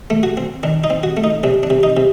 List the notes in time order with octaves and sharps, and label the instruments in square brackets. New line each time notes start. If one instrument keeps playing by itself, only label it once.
[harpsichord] A3
F#4
C4
D#3 D4
D#4
C4
F#4
A3
D#4
C3 D4
D4
C3
D#4
C3